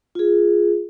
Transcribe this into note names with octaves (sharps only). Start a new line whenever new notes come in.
F4 G#4